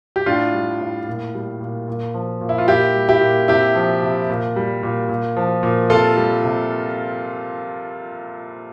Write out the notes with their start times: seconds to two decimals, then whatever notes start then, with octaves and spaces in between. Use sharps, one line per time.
0.16 G4
0.26 A2 D4 F4
0.54 G3
0.81 A2
1.07 A#2
1.35 G3
1.61 A#2
1.88 A#2
2.14 F3
2.41 A#2
2.49 E4
2.58 F4
2.68 A#2 E4 G4
2.95 G3
3.09 E4 G4
3.21 A#2
3.48 C3 E4 G4
3.76 F3
4.02 C3
4.29 A#2
4.56 G3
4.83 A#2
5.09 A#2
5.37 F3
5.63 A#2
5.90 C3 F4 A4
6.17 G3
6.44 C3